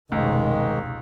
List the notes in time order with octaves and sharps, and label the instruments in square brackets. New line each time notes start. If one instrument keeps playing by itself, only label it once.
[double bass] F1 B2 [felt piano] C#2 [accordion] G#2 D#3 G#3